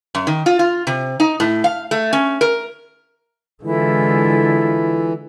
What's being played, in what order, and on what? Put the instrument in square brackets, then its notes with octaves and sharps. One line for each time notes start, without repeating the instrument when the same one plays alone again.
[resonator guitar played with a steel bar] F#2
D#3
F4
F4
C3
D#4
A2
F5
A3
C#4
A#4
[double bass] D3 G#3 [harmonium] E3 [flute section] E4 F4 A4